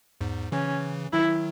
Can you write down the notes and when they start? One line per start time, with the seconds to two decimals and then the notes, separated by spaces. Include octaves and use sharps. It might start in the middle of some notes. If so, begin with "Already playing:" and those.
0.21 E2 G#2
0.52 C#3 E3 C#4
1.12 D#3 F#3 E4